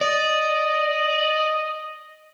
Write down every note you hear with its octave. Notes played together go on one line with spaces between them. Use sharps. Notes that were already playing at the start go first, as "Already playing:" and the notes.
D5 D#5